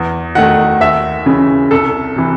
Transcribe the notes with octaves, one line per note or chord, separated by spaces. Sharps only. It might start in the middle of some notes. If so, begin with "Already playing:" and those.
Already playing: E2
D#3 A3 F#5
D#2 E5
C#3 E3 G#3
C2 A4
C3 E3